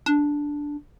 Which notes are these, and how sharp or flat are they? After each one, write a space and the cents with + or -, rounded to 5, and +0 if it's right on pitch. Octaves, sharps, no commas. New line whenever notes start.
D4 -5